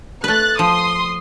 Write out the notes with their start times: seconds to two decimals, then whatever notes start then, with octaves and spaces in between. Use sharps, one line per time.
0.24 A3 B4 F#6 A6
0.59 F3 C6 D#6